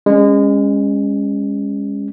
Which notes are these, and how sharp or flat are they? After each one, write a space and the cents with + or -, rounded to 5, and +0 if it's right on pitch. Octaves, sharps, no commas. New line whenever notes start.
G#3 -30 C#4 +0